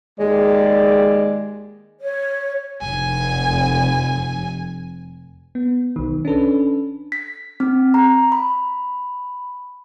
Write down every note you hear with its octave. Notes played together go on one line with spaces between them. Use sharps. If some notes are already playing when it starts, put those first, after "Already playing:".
D#2 G#3 G#4 D5
C#5
F1 G#5
B3
B1 D#3
C#4 D4 A4 B4
B6
C4
A#5
B5